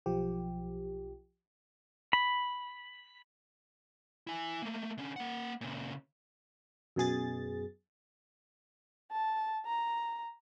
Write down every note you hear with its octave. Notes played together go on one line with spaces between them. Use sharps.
B1 F3 G4
B5
E4 G#5
A3 A#3
D3 C#4
A#3 F#5
A#2 C#3
F#2 B2 G#4 A6
A5
A#5